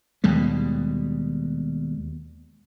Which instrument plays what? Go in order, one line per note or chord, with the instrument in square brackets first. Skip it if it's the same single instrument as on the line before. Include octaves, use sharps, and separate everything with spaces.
[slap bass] D#2 B2 G3 G#3